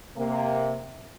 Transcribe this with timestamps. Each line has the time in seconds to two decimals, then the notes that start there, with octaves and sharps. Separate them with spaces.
0.16 C3 A#3